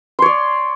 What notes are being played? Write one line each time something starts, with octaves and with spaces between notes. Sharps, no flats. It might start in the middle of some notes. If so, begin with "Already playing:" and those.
C#5 D5 C6